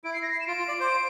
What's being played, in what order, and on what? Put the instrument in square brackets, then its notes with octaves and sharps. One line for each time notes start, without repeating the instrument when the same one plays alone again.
[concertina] E4 [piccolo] D7
[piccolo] C7
A#6
C7
E7
[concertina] F4 [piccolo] D7
[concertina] F4
D5
C5